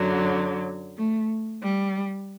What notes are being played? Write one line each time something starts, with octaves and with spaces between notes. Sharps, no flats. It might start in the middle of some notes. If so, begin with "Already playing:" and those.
Already playing: F#2 D3 F#3
A3
G3